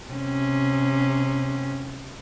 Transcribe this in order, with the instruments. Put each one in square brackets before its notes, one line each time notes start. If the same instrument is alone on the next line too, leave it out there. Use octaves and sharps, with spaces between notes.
[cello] C3 C#4